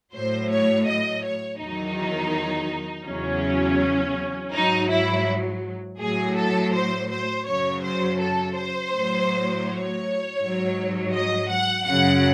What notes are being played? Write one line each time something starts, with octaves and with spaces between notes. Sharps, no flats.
A2 F#3 C5
C#5
D#5
C#5
E2 D#3 F#3 D#4
E2 C#3 F#3 C#4
G#2 F#3 D#4
E4
A2 F#3 G#4
A4
C5
C5
F#2 C#3 F#3 C#5
C5
A4
C5
A2 F#3
C#5
G#2 F#3
D#5
F#5
F#2 C#3 F#3 F#5